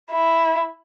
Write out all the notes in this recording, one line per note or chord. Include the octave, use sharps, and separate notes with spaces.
E4